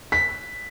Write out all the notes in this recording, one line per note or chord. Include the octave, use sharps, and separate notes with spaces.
B6